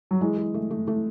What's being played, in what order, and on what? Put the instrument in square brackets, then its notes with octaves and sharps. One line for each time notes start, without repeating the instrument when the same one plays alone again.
[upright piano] F#3
[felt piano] E3 [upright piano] G#3
[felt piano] G#4
A3
A3
A3